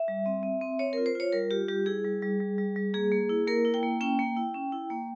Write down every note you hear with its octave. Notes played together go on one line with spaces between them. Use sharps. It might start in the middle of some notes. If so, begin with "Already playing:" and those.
Already playing: E5
G3
C4
C4
C4
C4 C#5
F4 A#4
C5
F4 C#5
G3 A#4
F4 G4
G3 G4
E4 G#4
G3
G3
G3
G3
G3
A#3 G#4
A#3
E4
A#3 A#4
E4
G5
A#3
C#4 G5
A#3
E4
C#4
E4
A#3